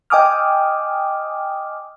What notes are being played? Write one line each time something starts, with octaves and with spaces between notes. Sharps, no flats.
D#5 G5 G#5 D6 D#6 F6